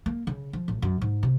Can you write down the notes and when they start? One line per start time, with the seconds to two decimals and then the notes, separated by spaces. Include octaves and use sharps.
0.06 A#3
0.27 C#3
0.53 F3
0.68 A1
0.82 F#2
1.02 G#2
1.23 C3